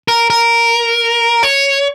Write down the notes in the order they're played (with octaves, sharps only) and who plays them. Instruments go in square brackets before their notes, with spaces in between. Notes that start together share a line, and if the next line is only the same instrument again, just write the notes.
[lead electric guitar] A#4
A#4
C#5